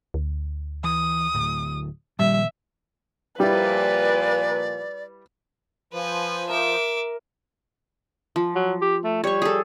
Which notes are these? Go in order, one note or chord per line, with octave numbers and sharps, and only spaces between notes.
D2
E3 D#6
D1 A2
A#2 D#3 F3 G3 E5
A#2 F3 G3 E4 B4 D5
F3 B4 G#5
A#4 E5 D6
F3
F#3
G4
A3
G3 C#5 C#6
G#4 A4